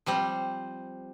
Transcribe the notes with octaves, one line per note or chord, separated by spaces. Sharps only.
F3 G3 C4